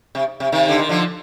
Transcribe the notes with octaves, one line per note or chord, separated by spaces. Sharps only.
C3
C3
C3 D#3
D3
D#3
D3 F3